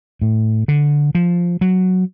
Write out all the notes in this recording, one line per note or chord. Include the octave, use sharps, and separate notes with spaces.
A2
D3
F3
F#3